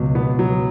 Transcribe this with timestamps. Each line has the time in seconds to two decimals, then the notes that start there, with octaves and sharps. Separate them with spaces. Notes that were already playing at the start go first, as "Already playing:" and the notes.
Already playing: C#2 B2 F#3
0.15 B3
0.39 F#3